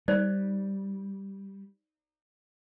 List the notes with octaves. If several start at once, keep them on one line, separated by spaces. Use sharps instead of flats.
G3 D#4 C5 D5